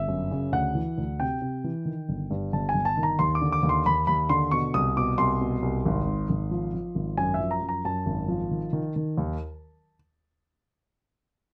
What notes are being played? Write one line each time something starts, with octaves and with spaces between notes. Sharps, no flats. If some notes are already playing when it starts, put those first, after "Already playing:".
Already playing: G1 E5
F#2
C#3
D2 F#5
E3
D2
C3 G5
C3
E3
D#3
G1
G2
G1 A5
G#5
G1
A5
D#3
A#5
D#2 C6
D6
D3
D6
D#2
C6
D#2 B5
D#2 B5
D3 C6
B2 C#6
C2 D#6
B2 D6
C2 C6
B2
C2
G#1
G#2
G#1
F3
F3
G#1
F#2 G#5
E5
F3
A#5
F#2
A#5
F#2 A5
G#1
F3
D#3
D#3
D#3
D#2